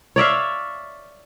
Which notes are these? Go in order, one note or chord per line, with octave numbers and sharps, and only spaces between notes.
C#5 D5 E5 F5